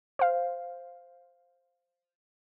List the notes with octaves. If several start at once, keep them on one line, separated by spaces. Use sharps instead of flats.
C5 F5